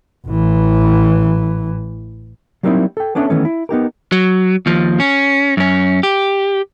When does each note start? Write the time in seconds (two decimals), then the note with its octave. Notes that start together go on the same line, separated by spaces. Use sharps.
0.28 A1 E3
2.63 F#3 G3 A#3 C4 D#4 E4
2.97 A4 G5
3.15 B3 C#4 D4 A4 C#5 E5
3.30 D#3 E3 A3 B3 C#4
3.45 E4
3.69 B3 D#4 G4 A#4
4.12 F#3
4.66 D#2 F3
5.00 C#4
5.57 F#2 C#4
6.03 G4